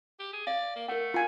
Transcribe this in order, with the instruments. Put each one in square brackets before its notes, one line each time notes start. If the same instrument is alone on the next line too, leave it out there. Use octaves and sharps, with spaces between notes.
[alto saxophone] G4
G#4
[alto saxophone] D5 [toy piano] F5
[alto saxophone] A#3
[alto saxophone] A3 [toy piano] A#4 F#5
[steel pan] F4 G#5